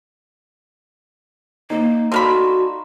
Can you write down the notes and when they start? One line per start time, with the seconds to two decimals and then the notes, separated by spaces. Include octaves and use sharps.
1.70 A#3 D#4 D#5
2.12 D3 F#4 F5 B5 C6